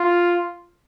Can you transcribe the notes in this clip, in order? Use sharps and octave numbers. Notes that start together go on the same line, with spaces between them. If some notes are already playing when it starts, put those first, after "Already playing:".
Already playing: F4